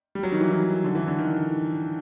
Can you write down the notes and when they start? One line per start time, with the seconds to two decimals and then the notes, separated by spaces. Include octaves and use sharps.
0.15 G3
0.23 F#3
0.32 D#3
0.41 E3
0.50 D#3
0.85 D3
0.95 E3
1.07 D3
1.18 D#3